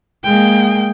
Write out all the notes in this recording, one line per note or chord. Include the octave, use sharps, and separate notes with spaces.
G#3 A#3 G5